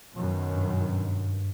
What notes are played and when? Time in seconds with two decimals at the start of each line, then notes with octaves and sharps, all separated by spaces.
0.16 F#2 B2 D#3
0.54 G2